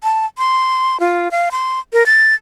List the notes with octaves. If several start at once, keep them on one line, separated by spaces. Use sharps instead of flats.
A5
C6
F4
F5
C6
A#4
A6